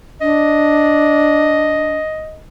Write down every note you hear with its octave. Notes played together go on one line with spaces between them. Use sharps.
D4 D#5